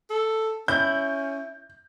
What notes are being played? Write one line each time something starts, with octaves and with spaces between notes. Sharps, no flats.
A4
C#4 E4 G6